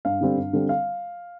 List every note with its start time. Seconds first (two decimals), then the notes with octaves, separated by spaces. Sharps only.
0.05 G2 F5
0.21 D3 G3 C4
0.37 G2
0.53 D3 G3 C4
0.69 F5